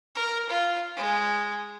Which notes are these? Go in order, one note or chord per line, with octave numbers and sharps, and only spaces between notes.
A#4
F4
G#3